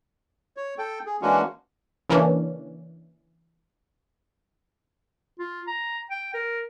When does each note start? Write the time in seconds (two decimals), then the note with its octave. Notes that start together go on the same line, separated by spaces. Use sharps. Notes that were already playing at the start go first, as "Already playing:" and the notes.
0.57 C#5
0.78 A4 G5
1.06 G#4
1.22 E3 G#3 A#3 C#4 D4 F#4
2.09 C#3 E3 A#3 C#4 D4
5.39 F4
5.67 A#5
6.10 G5
6.34 A#4